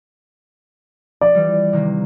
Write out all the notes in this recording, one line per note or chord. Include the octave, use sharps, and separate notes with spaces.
F3 D5
E3 G3
C3 D#3 A#3